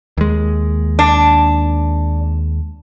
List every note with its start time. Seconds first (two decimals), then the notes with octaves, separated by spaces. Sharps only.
0.17 D#2 G#3
0.99 D4